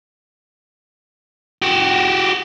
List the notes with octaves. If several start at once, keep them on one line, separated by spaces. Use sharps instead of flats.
F#4 G4